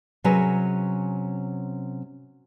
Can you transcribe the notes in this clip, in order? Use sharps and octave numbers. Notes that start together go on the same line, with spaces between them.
C3 F#3 C#4 G#4 A#4 B4